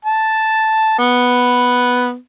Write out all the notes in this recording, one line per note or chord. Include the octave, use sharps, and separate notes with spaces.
A5
B3